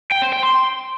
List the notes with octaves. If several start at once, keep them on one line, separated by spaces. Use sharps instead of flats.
G5
C5
G5
C6